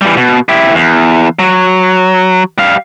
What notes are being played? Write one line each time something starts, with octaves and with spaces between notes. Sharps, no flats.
E3 G3
B2
E4 G4
E2
F#3
G3 F5